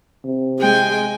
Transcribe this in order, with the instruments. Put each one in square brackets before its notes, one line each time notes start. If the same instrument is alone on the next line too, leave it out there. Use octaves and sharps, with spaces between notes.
[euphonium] C3
[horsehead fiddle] G#3 [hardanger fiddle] G5 G#5